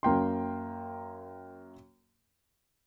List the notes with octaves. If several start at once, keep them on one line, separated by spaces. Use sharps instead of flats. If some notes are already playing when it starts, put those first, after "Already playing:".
F#2 A#3 G5 C6